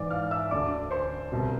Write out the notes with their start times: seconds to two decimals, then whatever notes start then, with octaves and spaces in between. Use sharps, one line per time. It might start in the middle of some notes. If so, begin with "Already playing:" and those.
Already playing: G#2 E3 D5 D6
0.10 F5 F6
0.31 E5 E6
0.51 D2 D3 D5 D6
0.91 C5 C6
1.32 C2 B2